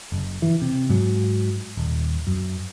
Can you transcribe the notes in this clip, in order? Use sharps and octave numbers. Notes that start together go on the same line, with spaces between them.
F#1
E3
C3
G#2 F#3
D#1
F#2